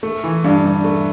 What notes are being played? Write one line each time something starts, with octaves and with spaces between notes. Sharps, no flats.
A3
E3
G2
G2
A3